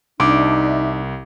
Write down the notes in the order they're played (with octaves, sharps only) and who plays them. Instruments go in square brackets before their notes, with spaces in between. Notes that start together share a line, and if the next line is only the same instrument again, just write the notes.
[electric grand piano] C2 [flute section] D4 D#4 E5 [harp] D6